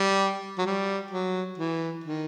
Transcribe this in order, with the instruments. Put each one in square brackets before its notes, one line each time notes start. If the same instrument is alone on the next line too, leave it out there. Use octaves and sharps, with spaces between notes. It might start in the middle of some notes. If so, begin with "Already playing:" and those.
Already playing: [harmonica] G3
F#3
G3
F#3
E3
D#3